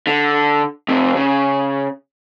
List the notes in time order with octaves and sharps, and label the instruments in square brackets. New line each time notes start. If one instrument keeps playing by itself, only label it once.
[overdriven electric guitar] D3
F2 C3
C#3